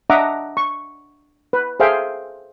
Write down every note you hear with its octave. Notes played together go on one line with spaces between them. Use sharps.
D4 D#5 E5 F#5 A#5 D6
C#6
B4
G#4 A4 C5 E5 F5 G5